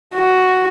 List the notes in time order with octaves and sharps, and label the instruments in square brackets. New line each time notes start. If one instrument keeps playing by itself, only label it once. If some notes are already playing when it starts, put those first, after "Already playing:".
[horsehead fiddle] F#4